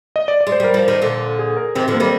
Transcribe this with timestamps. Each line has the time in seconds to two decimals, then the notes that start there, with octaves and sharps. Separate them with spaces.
0.16 D#5
0.28 D5
0.41 D5
0.47 G#3
0.52 C5
0.60 G3 A#4
0.74 F3
0.88 D#3
1.02 A#2 D3
1.39 G#4
1.57 A#4
1.75 C3 D#3 C4
1.88 D3 F3
1.94 A#3
2.00 D#3 G3